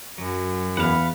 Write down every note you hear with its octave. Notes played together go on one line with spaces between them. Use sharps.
F#2 F#3
E2 F5 F#5 B5